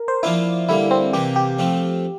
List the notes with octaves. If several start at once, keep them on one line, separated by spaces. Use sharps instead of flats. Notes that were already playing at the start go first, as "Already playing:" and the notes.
Already playing: A#4
C5
F3 A#3 D4 E4 F4
D3 G3 A#3 E4
C4
C3 E3 A#3 G4
G4
F3 A3 C4